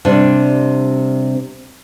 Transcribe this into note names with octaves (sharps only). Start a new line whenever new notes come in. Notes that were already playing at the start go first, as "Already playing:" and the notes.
C3 G3 D4